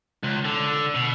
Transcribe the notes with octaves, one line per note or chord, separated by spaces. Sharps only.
C#2
D3
B2